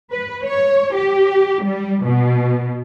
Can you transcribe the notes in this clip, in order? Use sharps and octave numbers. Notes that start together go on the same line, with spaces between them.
B4
C#5
G4
G3
B2